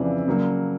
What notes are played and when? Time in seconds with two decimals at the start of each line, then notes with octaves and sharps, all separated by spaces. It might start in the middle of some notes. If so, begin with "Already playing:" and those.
Already playing: F2 C#3 E3 D5
0.27 C#3 F#3 A#3